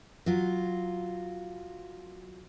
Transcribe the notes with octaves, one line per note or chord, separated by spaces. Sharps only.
F#3 F4